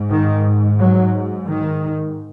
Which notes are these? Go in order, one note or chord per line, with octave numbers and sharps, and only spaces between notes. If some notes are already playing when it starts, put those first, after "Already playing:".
Already playing: G#2
D#3
F#3
D#3